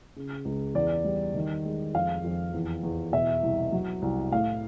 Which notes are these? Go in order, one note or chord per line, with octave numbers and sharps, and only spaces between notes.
C#3
C#2
E2 D5
G3
D#3
G#3
F2 F5
F2
E2
E2
B2 E5
C2
F#3
C2
A2 F5